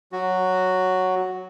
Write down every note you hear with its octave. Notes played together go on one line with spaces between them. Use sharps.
F#3 F#4